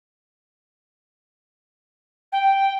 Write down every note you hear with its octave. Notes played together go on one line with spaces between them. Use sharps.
G5